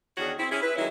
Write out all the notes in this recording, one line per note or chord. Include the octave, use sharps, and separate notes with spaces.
E2 D#3 D4 F#4 G#4 C#5
C4 E4
C#4 E4 G#4
E4 B4
D#3 F#3 G#3 C#4 E4